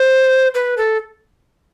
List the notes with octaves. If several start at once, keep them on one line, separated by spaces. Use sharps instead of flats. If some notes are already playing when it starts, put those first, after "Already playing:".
Already playing: C5
B4
A4